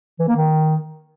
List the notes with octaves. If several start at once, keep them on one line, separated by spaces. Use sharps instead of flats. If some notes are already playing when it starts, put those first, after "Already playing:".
E3
A#3
D#3